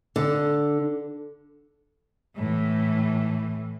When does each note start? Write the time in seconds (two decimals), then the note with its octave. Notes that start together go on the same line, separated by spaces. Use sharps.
0.16 D3
2.37 A2 E3